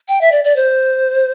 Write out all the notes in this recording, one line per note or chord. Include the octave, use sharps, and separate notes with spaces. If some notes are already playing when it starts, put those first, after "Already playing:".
G5
E5
D5
D5
C5